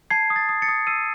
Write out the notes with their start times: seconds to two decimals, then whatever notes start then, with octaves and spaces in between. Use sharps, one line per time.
0.10 A5 G#6 C7
0.30 D#6
0.36 A6
0.49 D#6
0.62 A6 C#7
0.68 D#6
0.87 E6 C7 D#7